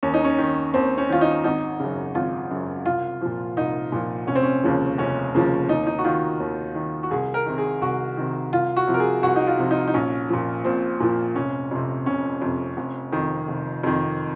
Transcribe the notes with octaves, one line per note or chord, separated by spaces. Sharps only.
D#2 C#4
D#4
C#4
D#3
D#2 C4
C#4
D#3 F4
D#4
G#1 D#4
F#2 C#3
G#1 F4
F#2 C#3
C2 F4
A#2 F3
C2 D#4
A#2 F3
F1 C#4
C4
C#4
D#2 C#3 F3
F1 C#4
D#2 C#3 F3
D#2 D#4
D#4
F#4
D#3 F4
D#2
D#3
F#4
C2 G#4
A#4
C3 D#3
G#4
C2 F#4
C3 D#3
C2 F4
F#4
C3 F3
A#4
G#4
C2 F#4
D#4
F4
C3 F3
D#4
D#4
A#1 C#4
A#2 F3
A#1 C4
A#2 F3
F1 C#4
F2 C3
F1 C#4
F2 C3
F1
F2 D#3
F1
F2 D#3